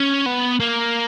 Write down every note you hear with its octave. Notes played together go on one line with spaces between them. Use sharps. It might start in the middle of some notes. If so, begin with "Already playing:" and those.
Already playing: C#4
B3
A#3